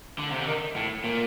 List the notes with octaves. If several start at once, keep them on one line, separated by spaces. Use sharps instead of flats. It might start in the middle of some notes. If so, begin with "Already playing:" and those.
D3
C3
D3
D#3
A2
A#2